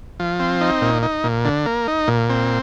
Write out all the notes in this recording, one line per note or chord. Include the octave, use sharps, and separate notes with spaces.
F3
C4
D#4
A#2
D#4
A#2
D3
A#3
D#4
A#2
C4